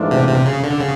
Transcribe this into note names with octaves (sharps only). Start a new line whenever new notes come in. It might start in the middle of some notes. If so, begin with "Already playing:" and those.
Already playing: G#2 E3 A3 D4 F4
C3
C3
C#3
D3
C#3